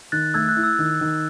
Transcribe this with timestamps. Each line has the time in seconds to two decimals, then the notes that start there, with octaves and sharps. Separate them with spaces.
0.12 D#3 F#6 A6
0.34 A3 E6 G#6
0.49 F#6
0.56 E4
0.64 E6
0.79 D#3
1.01 D#3